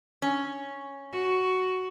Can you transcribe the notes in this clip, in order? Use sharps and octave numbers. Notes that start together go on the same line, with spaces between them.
C#4
F#4